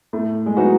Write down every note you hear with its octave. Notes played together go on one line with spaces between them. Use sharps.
A2 A3
G#3
E3 F#3 B3 D#4 F#4